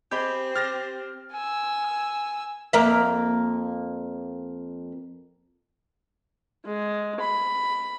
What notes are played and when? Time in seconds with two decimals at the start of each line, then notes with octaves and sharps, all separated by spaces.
0.11 C4 G4 G#4 D#5 B5 G6
0.56 G4 F6 A6 A#6
1.32 G#5 E6
2.73 F2 A#3 E5
6.66 G#3
7.20 B5